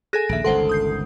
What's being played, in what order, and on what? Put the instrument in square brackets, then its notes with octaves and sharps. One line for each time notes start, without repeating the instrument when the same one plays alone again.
[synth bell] G#4 A4 G#5 [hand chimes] F#6 A#6
[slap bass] A#1 D#2 [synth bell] E5 D7
[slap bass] G1 C#2 D#3 [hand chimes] A4 [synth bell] C5 F#5 C6
[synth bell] D#6 G6 C7